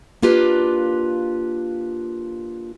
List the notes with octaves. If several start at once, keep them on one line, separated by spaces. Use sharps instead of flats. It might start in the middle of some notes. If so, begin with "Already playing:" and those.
A#3 D4 F4 G4 B4